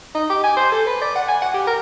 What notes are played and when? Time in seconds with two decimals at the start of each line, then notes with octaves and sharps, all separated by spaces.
0.15 D#4
0.30 G4
0.44 G#5
0.57 C5
0.72 A4
0.87 B4
1.02 D5
1.16 F#5
1.28 G#5
1.42 F#5
1.54 G4
1.67 A#4